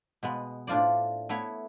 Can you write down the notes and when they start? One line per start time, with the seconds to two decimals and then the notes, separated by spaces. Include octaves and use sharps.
0.23 B2 G#3 B3
0.67 A2 D4 F4 C5 D5
1.29 A3 B3 E4 C#5